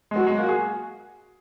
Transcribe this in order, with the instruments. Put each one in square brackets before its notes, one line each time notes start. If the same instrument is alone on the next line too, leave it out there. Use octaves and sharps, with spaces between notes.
[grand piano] G#3
[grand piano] F#3 [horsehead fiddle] F#4
[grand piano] G#3
A#3
G#4